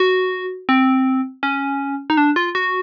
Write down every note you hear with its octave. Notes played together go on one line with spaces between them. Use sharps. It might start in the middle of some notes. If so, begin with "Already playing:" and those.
Already playing: F#4
C4
C#4
D#4
D4
F4
F#4